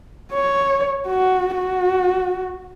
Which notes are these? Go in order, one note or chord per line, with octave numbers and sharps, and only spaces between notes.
C#5
F#4
F#4